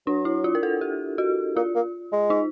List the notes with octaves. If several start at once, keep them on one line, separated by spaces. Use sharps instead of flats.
F#3 D4
E4
F4
A#4
A4
G4
F#4
A#3 F4
A#3
G#3
D#4